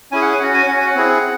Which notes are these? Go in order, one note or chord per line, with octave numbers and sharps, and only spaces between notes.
C#4 E4 G#4 G#5
F#5
G#5
C#4 F#4 F#5
G#5
C#4 F#4 F#5
G#5
F#5
C4 E4 G#4